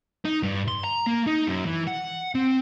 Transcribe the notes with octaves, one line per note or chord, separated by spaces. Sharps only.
D#4
G2
C6
A#5
A#3
D#4
F#2
E3
F#5
C4